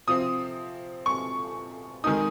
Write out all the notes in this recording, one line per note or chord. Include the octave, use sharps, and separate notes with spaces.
C3 F3 C4 D#6
C#6
D#3 G#3 D#4 D#6